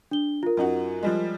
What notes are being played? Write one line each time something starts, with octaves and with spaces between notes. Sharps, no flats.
D4 G7
F4 A#4
F#2 D#4 F#4
F3 G3 G#3